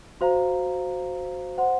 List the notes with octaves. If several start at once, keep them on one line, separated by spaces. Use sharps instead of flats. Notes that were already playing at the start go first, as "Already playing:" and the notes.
F#4 C5 F5 A#5
C5 F#5 C6